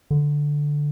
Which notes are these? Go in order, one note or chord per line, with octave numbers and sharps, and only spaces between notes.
D3